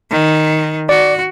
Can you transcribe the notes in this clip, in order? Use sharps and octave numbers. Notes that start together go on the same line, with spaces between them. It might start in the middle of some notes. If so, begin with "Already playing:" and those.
D#3
F#4 D5